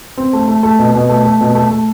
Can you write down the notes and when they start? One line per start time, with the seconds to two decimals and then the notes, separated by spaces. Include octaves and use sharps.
0.17 C4
0.33 A3
0.48 A3
0.63 A3
0.79 B2
0.95 B2
1.09 A3
1.25 A3
1.41 B2
1.55 A3
1.71 A3